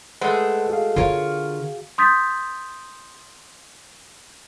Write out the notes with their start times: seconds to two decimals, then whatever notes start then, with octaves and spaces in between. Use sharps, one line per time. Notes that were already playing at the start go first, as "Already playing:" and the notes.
0.21 G#3 A3 B4 C5 F#5
0.69 F#4 G#4 F5
0.96 D3 F4 A#4 C#5
1.98 C6 D#6 G6 A6 B6